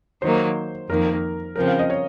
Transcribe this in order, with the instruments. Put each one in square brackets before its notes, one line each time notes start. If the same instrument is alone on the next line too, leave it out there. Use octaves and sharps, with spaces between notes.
[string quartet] D#3 F#3 A#3 [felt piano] C5
[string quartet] F2 D#3 A#3 [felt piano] A#4
[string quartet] C#3 F3 C4 [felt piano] A#4
[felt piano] F5
D#5
C#5